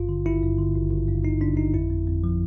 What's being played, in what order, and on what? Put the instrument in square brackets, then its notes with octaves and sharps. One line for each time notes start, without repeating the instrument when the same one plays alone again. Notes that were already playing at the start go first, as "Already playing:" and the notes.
Already playing: [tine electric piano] G#1 G2 F4
D3
G#1 E4
G2
D3
G#1
G#1
G2
G#1 D#4
D3 D4
G#1 D#4
F2 E4
F2
F2
F3